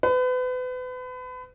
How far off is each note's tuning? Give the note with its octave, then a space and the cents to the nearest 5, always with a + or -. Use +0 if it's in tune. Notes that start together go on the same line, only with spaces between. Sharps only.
B4 +35